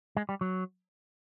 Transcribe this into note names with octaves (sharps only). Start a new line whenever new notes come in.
G#3
G3
F#3